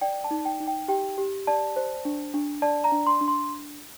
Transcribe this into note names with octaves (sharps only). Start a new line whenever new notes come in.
D5 G5
A5
D#4
G5
D#4
G5
G4 G5
G4
D5 A5
C5
D4
D4
D5 A5
A#5
D4
C6
D4
C6